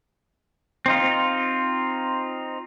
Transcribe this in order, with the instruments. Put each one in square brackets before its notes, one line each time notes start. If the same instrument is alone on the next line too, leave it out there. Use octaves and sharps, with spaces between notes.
[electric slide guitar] C4 D#4 F4